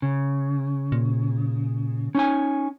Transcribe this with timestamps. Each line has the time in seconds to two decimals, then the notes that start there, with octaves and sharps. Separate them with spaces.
0.02 C#3
0.92 A#2
2.15 C#4 D#4 G#5